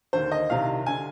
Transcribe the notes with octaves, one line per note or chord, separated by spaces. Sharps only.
D#2 D3 C5
D#5
C2 C3 D#3 F5
D3 G#5